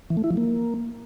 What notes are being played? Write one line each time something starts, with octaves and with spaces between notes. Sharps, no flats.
E3
A3
E4
F3
A#3